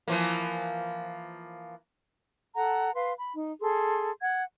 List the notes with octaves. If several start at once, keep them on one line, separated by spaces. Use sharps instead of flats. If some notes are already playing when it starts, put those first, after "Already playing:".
E3 F3 A#3
A4 F#5 A#5
B4 F5 C6
B5
D#4
G#4 A4 C6
F#5 G#6